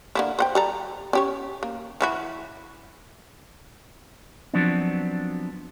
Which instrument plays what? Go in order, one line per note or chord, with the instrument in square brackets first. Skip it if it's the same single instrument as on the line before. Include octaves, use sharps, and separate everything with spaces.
[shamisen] D3 A#3 E4
C5 F#5 G5
G3 A4 A#5
C#4 G4 C#5
A#3
E3 E4 F#4
[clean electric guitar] F3 F#3 B3 C4 D4